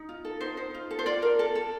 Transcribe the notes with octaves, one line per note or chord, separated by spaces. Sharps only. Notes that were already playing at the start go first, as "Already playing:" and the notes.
Already playing: D#4
F4
A4
D#4 C5
D#4 C5
F4
A4
C5
F4 D5
A#4
A4
A4